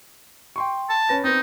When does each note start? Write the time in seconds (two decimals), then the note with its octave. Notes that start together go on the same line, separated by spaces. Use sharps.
0.56 G5 C6 C#6
0.89 A5
1.09 C#4 B4 A#6
1.24 B3 C4 D#4